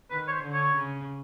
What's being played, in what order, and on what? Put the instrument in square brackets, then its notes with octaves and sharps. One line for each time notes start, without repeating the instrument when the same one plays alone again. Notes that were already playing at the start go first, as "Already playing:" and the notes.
[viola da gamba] D#3 [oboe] B4
[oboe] C#5
C5
[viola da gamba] D3
[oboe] C#5
[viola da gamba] C#3